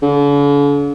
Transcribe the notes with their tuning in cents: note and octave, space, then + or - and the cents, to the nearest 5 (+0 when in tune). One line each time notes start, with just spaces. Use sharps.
D3 -45